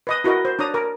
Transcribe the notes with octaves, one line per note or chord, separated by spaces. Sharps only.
B4 D#5 D#6
E4 F#4 A#4 D#5
C5
D4 C#5 A#5 D#6
A#4